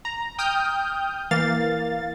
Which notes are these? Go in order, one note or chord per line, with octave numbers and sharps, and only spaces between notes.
A#5
G5 D#6 F6 G6
E3 A#3 F5 A6